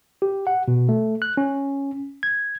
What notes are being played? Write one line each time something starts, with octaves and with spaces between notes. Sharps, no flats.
G4
F#5
B2
A3
F#6
C#4
G#6